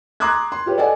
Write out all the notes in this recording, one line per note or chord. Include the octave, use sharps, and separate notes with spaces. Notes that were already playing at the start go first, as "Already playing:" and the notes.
A#5 C6 D6 D#6 F#6 G#6
C6
F4 G4 B4 C#5
A4 D5 D#5 F#5 G#5